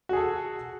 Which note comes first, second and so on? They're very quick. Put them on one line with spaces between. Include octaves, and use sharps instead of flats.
F#4 G#4 A4